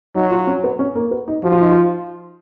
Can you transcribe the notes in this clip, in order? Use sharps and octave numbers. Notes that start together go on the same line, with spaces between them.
F#3 D#4
F4
C#4
B3
C#4
A#3
B3
D#4
F3 F#4
F4
D#4
F4